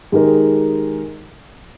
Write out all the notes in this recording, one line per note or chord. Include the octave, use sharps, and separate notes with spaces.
D#3 G#3 D#4 G4 A#4